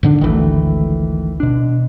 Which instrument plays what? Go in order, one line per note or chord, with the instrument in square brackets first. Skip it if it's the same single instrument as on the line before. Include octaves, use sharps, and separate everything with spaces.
[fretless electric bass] G#2 D3 D4
[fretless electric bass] G#1 D2 [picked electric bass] D#3 E3 A3
[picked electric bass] B2 D4